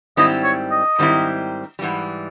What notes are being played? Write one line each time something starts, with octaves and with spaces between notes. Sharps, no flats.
G#2 D#3 G3 C4 E4 D#5
C#5
D#5
G#2 D#3 G3 C4 E4
G#2 E3 G3